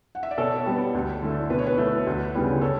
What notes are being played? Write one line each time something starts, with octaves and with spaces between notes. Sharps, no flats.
F#5
E5
D5
B2 A4 C#5
G3 B3
D2
D3 A3
B2 B4
C#5
B4
A3
D2
C#3 G3 B3
A4 C#5